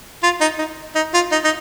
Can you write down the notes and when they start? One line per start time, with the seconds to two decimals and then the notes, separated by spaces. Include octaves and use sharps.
0.23 F4
0.41 D#4
0.59 D#4
0.95 D#4
1.14 F4
1.32 D#4
1.44 D#4